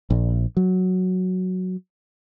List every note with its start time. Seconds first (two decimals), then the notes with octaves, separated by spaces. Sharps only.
0.10 A#1
0.57 F#3